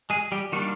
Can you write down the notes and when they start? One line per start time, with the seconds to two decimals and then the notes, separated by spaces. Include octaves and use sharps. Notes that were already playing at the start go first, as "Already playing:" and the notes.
0.10 G#3 G#4
0.32 G3 G4
0.52 D#3 G3 A#3 D4 F#4